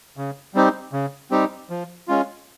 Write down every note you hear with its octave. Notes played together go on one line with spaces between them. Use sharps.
C#3
G3 C4 D#4 G4
C#3
G3 C4 D#4 G4
F3
G#3 C#4 F4